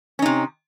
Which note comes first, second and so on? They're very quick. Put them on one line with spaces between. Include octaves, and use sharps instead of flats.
C#4 D#4 C3